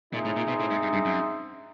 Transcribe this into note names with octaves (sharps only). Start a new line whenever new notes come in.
A#2 C4 D#4 G#4 C5 E5
A2
A#2
B2
A2
G#2
G2
G2
F#2